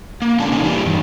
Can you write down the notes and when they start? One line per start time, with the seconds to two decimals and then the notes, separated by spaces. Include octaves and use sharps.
0.22 A#3
0.40 G#3 C#4 D4 F4 A4 A5
0.52 C3 C#4 D#4
0.64 E3 G3 A#3
0.85 G2 D#3